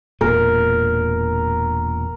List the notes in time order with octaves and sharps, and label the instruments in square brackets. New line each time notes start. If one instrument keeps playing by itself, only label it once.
[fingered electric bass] E1 A#2 [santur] A#4